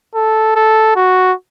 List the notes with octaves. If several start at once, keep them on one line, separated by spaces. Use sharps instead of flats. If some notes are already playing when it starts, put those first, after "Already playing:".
A4
A4
F#4